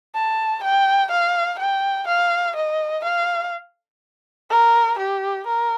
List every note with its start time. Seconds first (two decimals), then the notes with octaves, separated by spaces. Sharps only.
0.15 A5
0.63 G5
1.11 F5
1.59 G5
2.07 F5
2.56 D#5
3.04 F5
4.50 A#4
4.99 G4
5.47 A#4